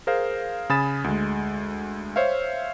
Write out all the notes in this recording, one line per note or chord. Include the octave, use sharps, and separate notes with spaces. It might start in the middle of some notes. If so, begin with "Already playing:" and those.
G#4 A#4 C5 F5
C#3 G#5 B5 D#6 A6 E7
D2 G#3
C5 C#5 E5 F5